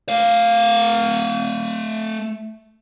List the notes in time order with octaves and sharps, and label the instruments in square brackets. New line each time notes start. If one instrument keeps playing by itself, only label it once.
[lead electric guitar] A3 F5